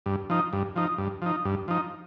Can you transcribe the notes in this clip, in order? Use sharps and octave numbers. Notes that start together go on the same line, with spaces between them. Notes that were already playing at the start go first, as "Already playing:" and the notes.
G2
F3 D#4
G2
F3 D#4
G2
F3 D#4
G2
F3 D#4